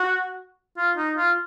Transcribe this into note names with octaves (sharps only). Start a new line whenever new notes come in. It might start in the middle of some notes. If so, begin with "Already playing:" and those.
Already playing: F#4
F4
D#4
F4